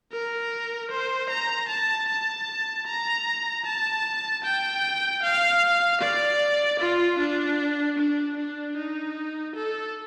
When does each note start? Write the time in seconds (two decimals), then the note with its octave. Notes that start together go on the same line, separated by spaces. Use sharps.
0.13 A#4
0.91 C5
1.30 A#5
1.69 A5
2.09 A5
2.87 A#5
3.66 A5
4.44 G5
5.23 F5
6.01 D5
6.80 F4
7.19 D4
7.99 D4
8.37 D4
8.77 D#4
9.56 A4